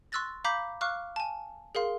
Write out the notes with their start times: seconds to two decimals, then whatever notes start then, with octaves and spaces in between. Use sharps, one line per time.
0.12 C6 C#6 E6 F#6 A6 A#6
0.44 F5 A#5 B5 D6 G6 B6
0.81 F5 C#6 D6 F6 F#6
1.16 G#5 A5
1.75 G#4 A#4 F5 C6